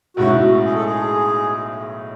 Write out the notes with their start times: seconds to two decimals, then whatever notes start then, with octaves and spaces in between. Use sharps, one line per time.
0.17 B1 A2 G#3 C#4 E4 F#4
0.64 G#4
0.74 A4
0.84 G#4